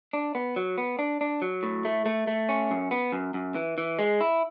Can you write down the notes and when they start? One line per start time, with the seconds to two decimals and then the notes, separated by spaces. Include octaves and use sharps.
0.13 D4
0.35 B3
0.56 F#3
0.78 B3
0.99 D4
1.21 D4
1.42 F#3
1.63 A2
1.85 A3
2.06 A3
2.27 A3
2.49 C#4
2.71 F#2
2.91 B3
3.12 F#2
3.34 F#2
3.55 E3
3.78 E3
3.99 G#3
4.21 E4